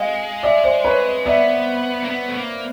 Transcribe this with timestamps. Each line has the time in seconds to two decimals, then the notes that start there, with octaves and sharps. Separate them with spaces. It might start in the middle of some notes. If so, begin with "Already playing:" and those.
Already playing: G#3 D#5 F5
0.43 D5 E5
0.64 C5 D5
0.85 B4 C#5
1.26 B3 D5 E5
2.03 A#3
2.10 B3
2.28 A3
2.36 A#3